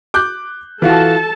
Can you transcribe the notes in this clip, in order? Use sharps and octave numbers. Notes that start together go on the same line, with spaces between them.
D6 F#6 G6
E3 F4 F#4 A4 A5